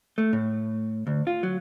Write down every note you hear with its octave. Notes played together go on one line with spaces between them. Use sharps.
A3
A2
D2
F4
F#3